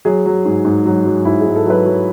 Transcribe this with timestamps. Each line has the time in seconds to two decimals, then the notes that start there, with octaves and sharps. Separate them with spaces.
0.05 F#3 G#4
0.26 F#3
0.45 G#2
0.65 G#2
0.85 F#3
1.05 F#3
1.25 G#2 E4
1.41 G#4
1.46 G#2
1.56 A4
1.66 F#3 B4
1.86 F#3